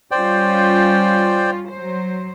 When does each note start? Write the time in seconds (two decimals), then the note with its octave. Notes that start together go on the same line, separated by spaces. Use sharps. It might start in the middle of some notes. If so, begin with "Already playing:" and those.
0.11 G3 C#4 F4 C5 D5 G5
1.70 F#3 C5